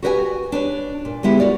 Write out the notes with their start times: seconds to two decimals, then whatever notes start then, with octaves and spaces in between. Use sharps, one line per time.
0.02 F#4 G4 A#4 B4 D#5 G#5
0.52 D4 B4 C#5
1.05 A#2
1.23 D3 G#3 B3 E4 G4
1.40 F#4 A#4 D5